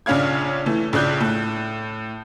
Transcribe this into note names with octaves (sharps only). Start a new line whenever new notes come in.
A#1 C#3 C#4 D4 F5 G#6
E3 A3
A#1 C#3 D5 F#6 G6
A2